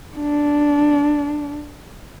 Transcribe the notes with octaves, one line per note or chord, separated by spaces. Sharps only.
D4